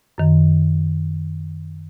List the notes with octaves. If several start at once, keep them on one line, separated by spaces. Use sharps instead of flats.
F#2 D#3